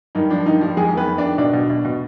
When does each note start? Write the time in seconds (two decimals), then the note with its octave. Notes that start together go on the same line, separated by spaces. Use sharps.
0.15 G2 D#3 D#4
0.30 F3 D4
0.46 G2 D#3 D#4
0.61 F3 G3 G4
0.76 F2 G#3 G#4
0.93 D#3 B3 B4
1.08 F2
1.18 D#3 D4 D5
1.38 B2 D4 D5
1.53 B2
1.70 B2
1.85 B2